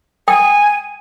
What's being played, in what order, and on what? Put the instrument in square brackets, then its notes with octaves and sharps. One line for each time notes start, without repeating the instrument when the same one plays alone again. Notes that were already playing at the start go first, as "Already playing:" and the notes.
[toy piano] G5 D#6 [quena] G#5